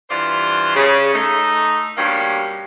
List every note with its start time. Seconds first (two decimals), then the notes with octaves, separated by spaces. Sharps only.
0.09 G2 E3 F4 C5 D5
0.75 C#3
1.13 A3 D#4
1.97 G2 B2 G3 A#3 C#4